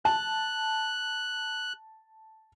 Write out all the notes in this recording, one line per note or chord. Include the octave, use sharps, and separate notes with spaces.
A5 F#6